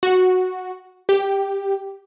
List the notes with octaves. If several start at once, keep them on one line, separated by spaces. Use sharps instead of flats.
F#4
G4